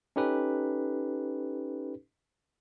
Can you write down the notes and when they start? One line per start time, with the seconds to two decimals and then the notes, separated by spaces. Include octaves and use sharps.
0.16 C#4 D#4 G4 A4 B4